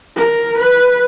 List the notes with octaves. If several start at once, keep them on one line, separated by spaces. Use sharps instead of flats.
A#4
B4